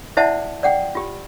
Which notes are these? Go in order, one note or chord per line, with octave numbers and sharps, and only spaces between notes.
E4 C5 D5 E5 F#5 A5
D5 F#5 G5
F4 G4